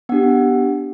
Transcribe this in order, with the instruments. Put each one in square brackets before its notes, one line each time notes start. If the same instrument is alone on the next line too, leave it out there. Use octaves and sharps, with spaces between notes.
[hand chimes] B3 D4 G4 F#5
F#5